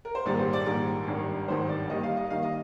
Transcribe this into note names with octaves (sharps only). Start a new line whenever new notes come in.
A#4
C5
A#1 G#2 D#3 G3 D5
C5
D5
A#1 G#2 D#3 G3 A#4
G#1 G2 D#3 G3
G#1 G2 D#3 G3 C5
D5
D#2 D#3 G3 D#5
F5
D#5
D#2 D#3 G3 F5
D#5